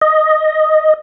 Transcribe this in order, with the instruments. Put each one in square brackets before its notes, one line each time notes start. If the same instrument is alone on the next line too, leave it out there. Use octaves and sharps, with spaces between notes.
[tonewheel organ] D#5